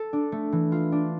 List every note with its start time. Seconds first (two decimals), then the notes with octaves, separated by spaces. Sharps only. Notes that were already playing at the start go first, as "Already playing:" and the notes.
Already playing: A4
0.13 D4
0.32 A3
0.52 E3
0.72 F4
0.92 D4